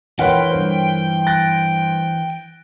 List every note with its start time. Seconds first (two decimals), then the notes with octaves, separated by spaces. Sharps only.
0.19 E3 F4 A#4 B4 C#5 F#5 G5 B5
0.50 G2 C5
1.27 F#6 A6 A#6